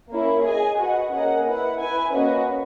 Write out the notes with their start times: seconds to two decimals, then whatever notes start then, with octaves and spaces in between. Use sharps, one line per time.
0.10 A#3 C#4 E4
0.44 G#4 D#5 G#5
0.79 F#4 B4 D#5 F#5
1.13 A#3 C#4 G#4 D#5 F#5
1.47 E4 B4 F#5
1.80 E4 B4 E5 G#5
2.14 A#3 C#4 F#4 B4 D#5